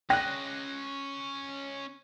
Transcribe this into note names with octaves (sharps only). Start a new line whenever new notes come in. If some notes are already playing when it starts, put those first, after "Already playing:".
C#4 D#5 G5 F#6 A#6